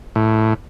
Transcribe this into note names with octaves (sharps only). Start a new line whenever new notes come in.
A2